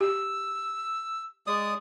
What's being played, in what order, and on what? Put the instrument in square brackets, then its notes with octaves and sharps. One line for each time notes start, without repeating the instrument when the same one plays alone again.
[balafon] G4 [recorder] E6
[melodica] G#3 D#6 [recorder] D5